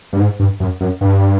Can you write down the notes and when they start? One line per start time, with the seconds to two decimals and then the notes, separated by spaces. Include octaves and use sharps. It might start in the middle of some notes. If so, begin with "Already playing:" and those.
0.13 G2
0.19 G#2
0.39 G2
0.60 F#2
0.81 F#2
1.01 G2